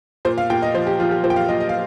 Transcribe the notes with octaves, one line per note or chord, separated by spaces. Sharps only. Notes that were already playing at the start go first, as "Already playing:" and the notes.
A#2 C5
F5
A#2 G5
D#5
F3 C5
G4
F3 F4
G4
A#2 C5
G5
F5
A#2 D#5
D#5
F5